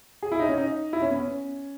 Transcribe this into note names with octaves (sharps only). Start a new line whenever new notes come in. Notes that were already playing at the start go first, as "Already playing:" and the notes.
G#4
E4
D#4
C#4
D#4
E4
C#4
B3
C#4